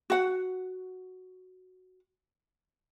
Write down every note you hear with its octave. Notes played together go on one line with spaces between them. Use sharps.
F#4 F#5